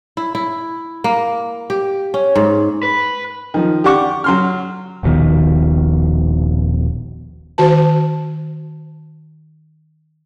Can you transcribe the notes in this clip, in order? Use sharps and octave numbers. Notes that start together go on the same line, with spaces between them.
E4
E4
A#3
G4
C#4
G#2
B4
D#3 F3
G4 D5 F#5 C#6 D6
F#3 C6 F6
D#1 A#1 B2 D#3
D#3 F#4 C5 A5